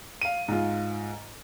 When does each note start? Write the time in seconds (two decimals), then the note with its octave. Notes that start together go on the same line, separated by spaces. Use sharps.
0.21 F5 D#7
0.48 G#2 F4